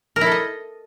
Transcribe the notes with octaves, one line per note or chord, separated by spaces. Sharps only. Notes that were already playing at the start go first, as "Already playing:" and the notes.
A#4
E4
A4
D#5